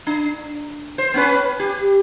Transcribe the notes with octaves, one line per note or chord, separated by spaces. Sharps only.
D4
C5
B3 C#4 B4
G4